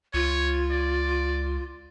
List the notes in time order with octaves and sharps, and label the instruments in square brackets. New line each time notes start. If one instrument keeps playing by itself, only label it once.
[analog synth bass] C#2 [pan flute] F4 [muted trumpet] C#5
[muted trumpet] D5